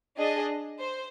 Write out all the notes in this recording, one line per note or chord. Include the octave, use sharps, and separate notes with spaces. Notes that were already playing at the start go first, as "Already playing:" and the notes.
D4 G#4 D#5
C5